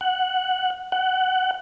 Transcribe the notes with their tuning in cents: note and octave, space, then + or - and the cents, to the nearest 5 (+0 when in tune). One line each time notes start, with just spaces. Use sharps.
F#5 +0
F#5 +20